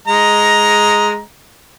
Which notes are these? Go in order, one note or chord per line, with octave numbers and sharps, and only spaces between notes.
G#3 D#5 A#5